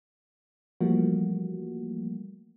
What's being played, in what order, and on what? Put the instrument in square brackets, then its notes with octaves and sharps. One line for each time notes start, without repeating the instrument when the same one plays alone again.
[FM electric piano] E3 F3 G3 A3 A#3 F#4